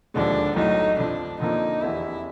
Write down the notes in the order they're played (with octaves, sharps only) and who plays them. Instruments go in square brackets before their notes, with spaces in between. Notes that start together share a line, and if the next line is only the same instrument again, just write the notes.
[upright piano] E1 D#2 D3 F3 G#3 [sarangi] D4
[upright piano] B1 A2 F#3 A3 [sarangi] D#4
[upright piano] F2 D3 F3 [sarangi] D4
[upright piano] F2 D3 F3 A#3 [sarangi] D#4
[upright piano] F1 E2 C3 [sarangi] E4